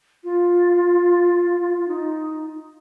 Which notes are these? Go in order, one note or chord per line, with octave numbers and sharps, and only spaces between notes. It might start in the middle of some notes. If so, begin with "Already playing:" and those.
F4
D#4